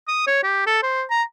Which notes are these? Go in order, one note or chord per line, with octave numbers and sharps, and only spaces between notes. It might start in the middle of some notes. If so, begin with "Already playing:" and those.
D#6
C#5
G4
A4
C5
A#5